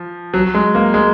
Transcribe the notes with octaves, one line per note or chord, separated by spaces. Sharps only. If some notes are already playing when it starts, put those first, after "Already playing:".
Already playing: F3
F#3
G#3
A#3
G#3